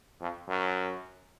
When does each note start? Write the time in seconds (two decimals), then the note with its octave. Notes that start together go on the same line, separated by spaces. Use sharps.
0.21 F2
0.48 F#2